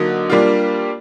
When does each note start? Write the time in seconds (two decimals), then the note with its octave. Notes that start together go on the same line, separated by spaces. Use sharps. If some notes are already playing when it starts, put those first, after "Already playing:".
Already playing: D3 F#3 A#3 D#4
0.30 G3 A#3 D4 F4